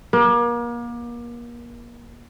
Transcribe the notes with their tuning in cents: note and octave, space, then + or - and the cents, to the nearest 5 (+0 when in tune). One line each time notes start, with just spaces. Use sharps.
A#3 +35